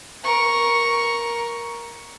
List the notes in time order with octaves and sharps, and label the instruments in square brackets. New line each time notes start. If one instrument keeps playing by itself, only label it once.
[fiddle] A#4 C#6